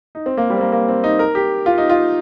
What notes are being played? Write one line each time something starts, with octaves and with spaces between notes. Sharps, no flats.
D#4
C4
A#3
G3
C4
A#3
A#3
C4
D#4
A#4
G4
F4
D#4
F4